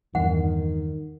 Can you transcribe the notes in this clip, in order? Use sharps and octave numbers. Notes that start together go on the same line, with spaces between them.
E2 G2 D#3 F#5